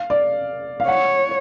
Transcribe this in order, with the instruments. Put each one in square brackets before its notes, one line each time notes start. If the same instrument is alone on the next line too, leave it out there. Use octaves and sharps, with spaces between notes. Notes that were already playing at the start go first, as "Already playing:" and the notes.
Already playing: [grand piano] F5
D5
F5
[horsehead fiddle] C#5 [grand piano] F#5